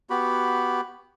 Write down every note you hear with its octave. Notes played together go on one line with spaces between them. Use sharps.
B3 F#4 G4 B5